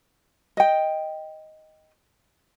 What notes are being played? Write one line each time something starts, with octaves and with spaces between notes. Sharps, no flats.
D#5 G5